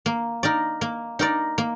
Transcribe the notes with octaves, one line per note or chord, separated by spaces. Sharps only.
A#3
D#4 A#4 D5
A#3
D#4 A#4 D5
A#3